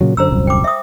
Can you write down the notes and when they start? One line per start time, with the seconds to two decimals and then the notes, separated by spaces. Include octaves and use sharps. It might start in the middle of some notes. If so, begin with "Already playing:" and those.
0.01 A#2 C#3 F#3
0.17 F#2 D3 C5 A#5 E6
0.30 D#1 C2 F#2
0.47 G5 D6
0.64 E5 D#6